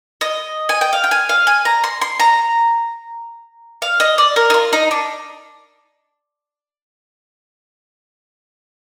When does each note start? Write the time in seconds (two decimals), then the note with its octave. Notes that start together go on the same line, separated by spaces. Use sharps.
0.21 D#5
0.69 G#5
0.81 G5
0.93 F5
1.04 G5
1.11 G#5
1.29 F5
1.47 G#5
1.65 A#5
1.84 C6
2.01 C6
2.20 A#5
3.82 F5
4.00 D#5
4.18 D5
4.36 A#4
4.50 D#4
4.54 F4
4.73 D#4
4.91 D4